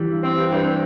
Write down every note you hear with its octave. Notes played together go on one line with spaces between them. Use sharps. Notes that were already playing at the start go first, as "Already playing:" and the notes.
Already playing: E3 G3
G2
C4
G2
G2
C4